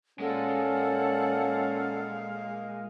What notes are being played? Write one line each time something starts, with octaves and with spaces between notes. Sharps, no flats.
A#2 G#3 C#4 A4 D5 F5 F#5